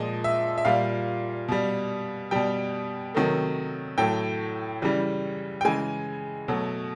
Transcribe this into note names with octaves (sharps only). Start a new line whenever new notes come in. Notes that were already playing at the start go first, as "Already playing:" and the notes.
Already playing: A#2 F3 G#3 D#5
E5
E5
A#2 G3 F5
B2 G3
B2 G3 G5
C3 D#3 F#3 A3
A2 F#3 A3 G5
C#3 E3 G3
G5
C#3 E3 G#3 G#5
B2 F#3 A3